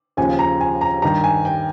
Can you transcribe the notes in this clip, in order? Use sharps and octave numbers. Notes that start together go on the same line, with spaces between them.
D#2 C#3 F3 G#5
A#5
G#5
A#5
G2 D#3 A#5
G#5
G5